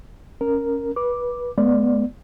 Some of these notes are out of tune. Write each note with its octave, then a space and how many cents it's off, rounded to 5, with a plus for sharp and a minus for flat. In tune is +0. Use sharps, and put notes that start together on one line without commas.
C#4 +0 A#4 +0
B4 -20 D6 +0
G#3 +45 B3 +0 D5 +0